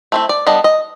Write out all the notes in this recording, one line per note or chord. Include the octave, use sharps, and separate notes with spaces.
A3 C4 E4
D5
G3 B3 D4 D#5
D#5